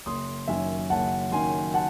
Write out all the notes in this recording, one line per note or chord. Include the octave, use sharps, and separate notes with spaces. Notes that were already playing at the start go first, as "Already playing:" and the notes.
F#1 C6 D#6
F#2 D#3 E5 G#5
F#1 F#5 A5
F#2 D#3 G#5 C6
F#5 A5